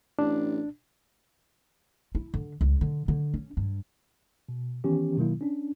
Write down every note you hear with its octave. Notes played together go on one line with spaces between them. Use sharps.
A1 D4
E4
D3
C#2
D3
D3
C#4
G2
B2
D#3 E3 B3 C#4 G4
B2 D#3 F#3 A#3 E4
C#4 D4